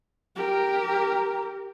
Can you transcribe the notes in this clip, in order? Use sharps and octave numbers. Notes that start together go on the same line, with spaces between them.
G4 A#4